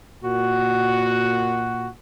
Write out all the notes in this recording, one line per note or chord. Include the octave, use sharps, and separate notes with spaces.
A#2 F#4